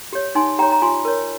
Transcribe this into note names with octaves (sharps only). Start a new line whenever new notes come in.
G4 C#5
D#4 G#5 C6
G4 C#5 G5 A#5
A#5
F4 G#5 C6
A#4 C#5